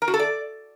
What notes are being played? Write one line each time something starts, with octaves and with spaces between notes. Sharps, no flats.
A#4
F#4
A4
D5